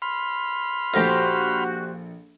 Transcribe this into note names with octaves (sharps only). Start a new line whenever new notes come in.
B5 C6 F6
A#1 F#4 G4 A4 C5 F5 A#6